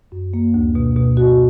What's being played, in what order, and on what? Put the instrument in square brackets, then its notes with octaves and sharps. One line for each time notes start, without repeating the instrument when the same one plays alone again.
[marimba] F#2
A#3
D2
B2
B2
F#4